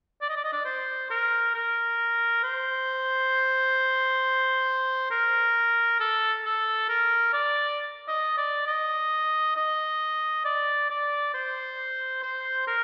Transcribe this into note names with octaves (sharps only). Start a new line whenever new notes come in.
D5
D#5
D5
D#5
D5
C5
A#4
A#4
C5
A#4
A4
A4
A#4
D5
D#5
D5
D#5
D#5
D5
D5
C5
C5
A#4